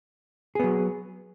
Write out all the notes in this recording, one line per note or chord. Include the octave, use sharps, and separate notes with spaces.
F#3 B3 G#4